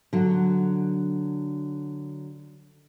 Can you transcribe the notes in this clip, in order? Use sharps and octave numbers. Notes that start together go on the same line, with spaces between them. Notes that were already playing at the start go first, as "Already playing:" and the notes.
D3 F#3